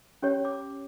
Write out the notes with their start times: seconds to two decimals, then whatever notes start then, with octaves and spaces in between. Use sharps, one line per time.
0.22 C#4 G4 C#5
0.45 D6